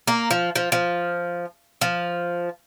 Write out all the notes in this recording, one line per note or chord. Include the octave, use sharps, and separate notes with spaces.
A#3
F3
F3
F3
F3